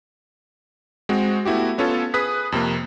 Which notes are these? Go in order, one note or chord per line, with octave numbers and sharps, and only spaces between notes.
G#3 C4 F#4
A3 B3 E4 F#4 G4
B3 C#4 F4 A4 C#5
G#4 B4 D#6 F#6 B6
F2 C3 A#3